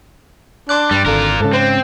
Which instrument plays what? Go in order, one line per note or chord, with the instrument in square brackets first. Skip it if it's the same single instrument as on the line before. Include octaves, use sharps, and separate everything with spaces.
[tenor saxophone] D4 [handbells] C6 D6 F#6
[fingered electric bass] G2 [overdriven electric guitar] G3
[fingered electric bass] G#1 [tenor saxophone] D3 [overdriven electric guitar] F4 A#4
[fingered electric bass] G#2 C#3 [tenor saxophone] A4
[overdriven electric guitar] C4 [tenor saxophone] C5